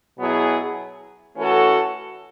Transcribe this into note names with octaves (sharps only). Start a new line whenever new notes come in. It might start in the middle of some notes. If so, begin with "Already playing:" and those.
B2 F#3 B3 E4 G#4
E3 A3 C#4 F#4 A4